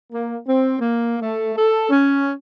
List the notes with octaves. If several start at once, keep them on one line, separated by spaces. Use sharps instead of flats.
A#3
C4
A#3
A3
A4
C#4